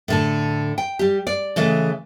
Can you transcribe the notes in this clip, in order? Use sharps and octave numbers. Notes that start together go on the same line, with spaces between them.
A2 D3 A4
G5
G3 G4
D5
C#3 E3 G#3 A3